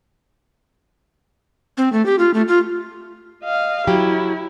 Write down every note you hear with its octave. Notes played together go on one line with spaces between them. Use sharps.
C4
A3
G4
F4
A3
F4
D#5 F5
F#3 E4 G4